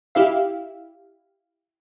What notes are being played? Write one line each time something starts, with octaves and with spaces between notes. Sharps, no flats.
E4 G4 E5 F5